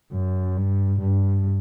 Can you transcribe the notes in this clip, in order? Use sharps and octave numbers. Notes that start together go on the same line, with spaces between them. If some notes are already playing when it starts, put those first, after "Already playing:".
F#2
G2
G2